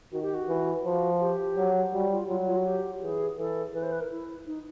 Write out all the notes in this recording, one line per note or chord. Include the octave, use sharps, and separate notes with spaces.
D#3 F#4
G4
F#4
E3
F3 F#4
G4
F#3
G3 F#4
F4
F#3 F4
F4
F#4
G4
E3 G#4
E3 A4
E3 B4
C5
B4
A#4
E4
D#4